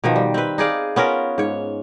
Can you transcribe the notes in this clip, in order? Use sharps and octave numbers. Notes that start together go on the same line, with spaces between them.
B2 D#3 F3
G3
C4 B4
D#4 G#4 D5 F5
B3 C#4 F4 A#4
G#2 C#5